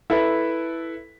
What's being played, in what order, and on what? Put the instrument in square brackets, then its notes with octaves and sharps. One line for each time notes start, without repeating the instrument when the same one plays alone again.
[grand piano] E4 A4 B4 E5